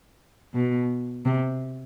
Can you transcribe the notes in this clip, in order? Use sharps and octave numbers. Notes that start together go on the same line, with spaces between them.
B2
C3